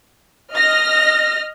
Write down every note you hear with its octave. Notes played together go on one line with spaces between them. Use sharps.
D#5 F6 A#6